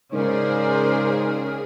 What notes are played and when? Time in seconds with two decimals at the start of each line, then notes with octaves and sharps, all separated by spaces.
0.13 G#2 C#3 G#4 A#4 C5 D5